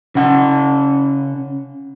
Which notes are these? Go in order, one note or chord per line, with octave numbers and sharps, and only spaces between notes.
C#3 F#5